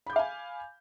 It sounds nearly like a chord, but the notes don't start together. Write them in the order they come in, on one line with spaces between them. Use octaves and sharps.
B5 G6 D6 F5 G#5